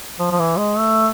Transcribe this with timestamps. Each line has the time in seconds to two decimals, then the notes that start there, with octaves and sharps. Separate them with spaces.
0.19 F3
0.31 F3
0.39 E3
0.58 G#3
0.78 A3